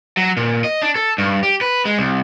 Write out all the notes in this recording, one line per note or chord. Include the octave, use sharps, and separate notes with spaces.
F#3
A#2
D#5
D4
A4
G2
G4
B4
G#3
C2